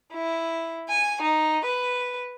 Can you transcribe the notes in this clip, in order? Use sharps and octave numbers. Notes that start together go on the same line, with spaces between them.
E4
G#5
D#4
B4